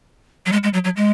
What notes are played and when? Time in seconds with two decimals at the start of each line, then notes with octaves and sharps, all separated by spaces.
0.46 F#3
0.52 G#3
0.63 G#3
0.74 F#3
0.84 F#3
0.97 G#3